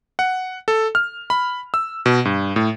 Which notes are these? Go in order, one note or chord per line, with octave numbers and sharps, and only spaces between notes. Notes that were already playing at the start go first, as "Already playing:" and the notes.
F#5
A4
F6
B5
E6
B2
G2
A2